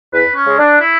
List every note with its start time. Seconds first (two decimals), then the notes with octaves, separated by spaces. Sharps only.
0.13 E2 B4
0.35 C#4
0.47 C#3 G#3
0.59 D4
0.80 E4